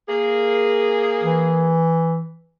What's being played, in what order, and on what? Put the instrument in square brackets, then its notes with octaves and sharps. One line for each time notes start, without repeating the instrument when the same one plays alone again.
[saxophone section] A#3 G#4
[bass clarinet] E3